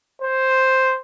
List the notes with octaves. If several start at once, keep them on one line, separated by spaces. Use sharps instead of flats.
C5